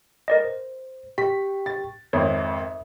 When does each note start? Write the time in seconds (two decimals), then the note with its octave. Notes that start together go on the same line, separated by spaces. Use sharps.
0.28 A#4 D5 D#5
0.44 C5
1.18 G4 G5 C#6 B6
1.66 A6
2.13 G#1 F2 A#4 C#5 E5 D#6